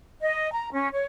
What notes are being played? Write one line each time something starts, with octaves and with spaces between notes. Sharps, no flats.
D#5
A#5
C#4
C#5